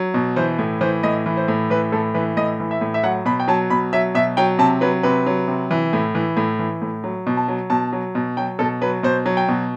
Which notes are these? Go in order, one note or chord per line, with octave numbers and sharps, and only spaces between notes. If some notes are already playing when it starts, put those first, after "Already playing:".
Already playing: F#3
B2
E3 C5
A2
E3 C5
A2 D#5
E3
C5
A2
E3 B4
A2 A4
E3 B4
A2 D#5
E3
E5
A2
E5
F#3 F#5
B2 B5
G5
F#3 A5
B2 B5
F#3 E5
B2 E5
F#3 G5
C3 A5
F#3 B4
C3 B4
F#3
C3
E3
A2
E3
A2
E3
A2
F#3
B2
A5
F#3
B2 A5
F#3
B2
F#3 G5
B2 A4
F#3 B4
B2 C5
F#3
G5
B2